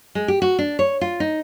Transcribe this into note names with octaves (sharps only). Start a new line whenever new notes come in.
G#3
G4
F#4
D4
C#5
F4
D#4